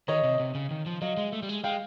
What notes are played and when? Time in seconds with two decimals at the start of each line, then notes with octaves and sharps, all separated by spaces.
0.08 D#3 C#5 D#5
0.24 C3
0.40 C3
0.55 C#3
0.71 D#3
0.86 F3
1.01 F#3 D#5 F5
1.17 G#3
1.32 A3
1.42 G3
1.49 G#3
1.64 G#3 F5 G5